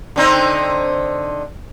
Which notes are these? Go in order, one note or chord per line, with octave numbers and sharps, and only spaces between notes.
D3 C4 D#4